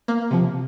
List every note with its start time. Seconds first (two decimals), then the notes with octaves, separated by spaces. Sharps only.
0.08 A#3
0.31 C3 F3